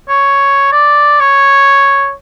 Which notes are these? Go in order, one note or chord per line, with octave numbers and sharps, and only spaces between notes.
C#5
D5
C#5